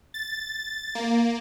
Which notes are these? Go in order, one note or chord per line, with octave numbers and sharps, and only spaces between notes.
A6
A#3